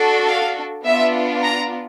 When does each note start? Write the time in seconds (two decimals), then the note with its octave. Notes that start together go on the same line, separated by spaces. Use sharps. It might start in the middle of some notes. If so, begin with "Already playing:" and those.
Already playing: D4 F#4 A4
0.27 F5
0.84 B3 D4 F4 E5
1.42 A#5